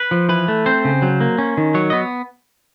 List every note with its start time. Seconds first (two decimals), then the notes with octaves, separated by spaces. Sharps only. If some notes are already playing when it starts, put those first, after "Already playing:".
Already playing: B4
0.11 F3
0.29 E3 B4
0.48 A3
0.66 C4 C5
0.85 C#3
1.02 F#3
1.21 A#3
1.38 C#4
1.57 D#3
1.74 F#3 C#5
1.90 B3 D#5